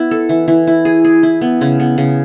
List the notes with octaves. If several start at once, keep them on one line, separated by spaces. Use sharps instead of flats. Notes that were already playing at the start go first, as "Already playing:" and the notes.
Already playing: B3 E4
A4
E3
E3
E4
G#4
G#4
E4
B3
C#3
B3
C#3